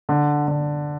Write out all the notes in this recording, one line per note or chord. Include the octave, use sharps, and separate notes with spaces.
D3
D3